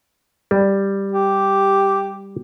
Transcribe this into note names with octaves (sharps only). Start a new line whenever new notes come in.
G3
G4